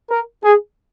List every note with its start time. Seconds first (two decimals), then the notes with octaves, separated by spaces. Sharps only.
0.10 A#4
0.44 G#4